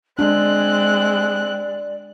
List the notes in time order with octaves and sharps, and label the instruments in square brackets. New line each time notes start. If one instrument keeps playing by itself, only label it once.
[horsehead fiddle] G#3 [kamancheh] C4 F#6 [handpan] D4 [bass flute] D5